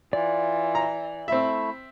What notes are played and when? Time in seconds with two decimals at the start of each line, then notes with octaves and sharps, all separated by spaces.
0.13 E3 F4 D5
0.75 A#5
1.28 A3 C4 E4 E5